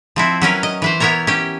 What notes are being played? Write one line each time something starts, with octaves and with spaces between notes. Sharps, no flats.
F3 C4 E4
F#3 C#4 A#4 B4
D#5
E3 B4 C5
B3 E4 A#4 C#5 A#5
C#4 G4